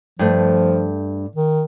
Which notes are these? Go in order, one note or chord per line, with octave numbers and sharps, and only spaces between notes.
G2 F3 A3
D#3